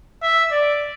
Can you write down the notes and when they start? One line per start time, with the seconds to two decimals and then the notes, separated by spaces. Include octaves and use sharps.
0.22 E5
0.51 D5